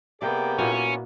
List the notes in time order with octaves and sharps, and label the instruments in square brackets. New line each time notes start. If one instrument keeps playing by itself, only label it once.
[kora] C3 [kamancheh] A#3 B3 [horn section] G#4 D5 G5
[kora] A#2 E4 F#4 [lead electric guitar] C#4